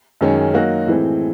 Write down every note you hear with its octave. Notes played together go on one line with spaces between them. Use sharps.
F#2 D#3 G#3 C#4
F#3 A#3 D#4 F#4
A2 E3 G#3 C4